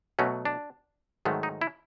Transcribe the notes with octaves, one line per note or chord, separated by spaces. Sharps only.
B2 F#3 A3 C#4
D4
G#2 D#3 F#3 A3
D#4
E4